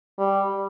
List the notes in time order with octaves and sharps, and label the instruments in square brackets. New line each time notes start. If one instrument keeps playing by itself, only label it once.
[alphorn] G3